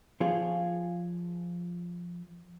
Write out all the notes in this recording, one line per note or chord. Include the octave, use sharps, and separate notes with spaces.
F3 F4 G#4 C#5